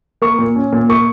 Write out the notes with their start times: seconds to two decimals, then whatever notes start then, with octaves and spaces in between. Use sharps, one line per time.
0.22 A#3 C#6
0.39 A#2
0.56 C#4
0.72 A#2
0.89 A#3 C#6